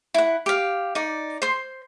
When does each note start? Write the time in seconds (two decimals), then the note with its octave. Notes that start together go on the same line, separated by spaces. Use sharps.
0.14 E4 F#5
0.46 G4 F5
0.95 D#4 D5
1.42 C5 C6